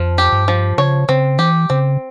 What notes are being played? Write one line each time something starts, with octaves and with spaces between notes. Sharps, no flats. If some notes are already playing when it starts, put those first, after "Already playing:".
Already playing: F2 F3
G4
G2
F3
C#3 C#5
C#3 C4
E3 G4
C#3 C4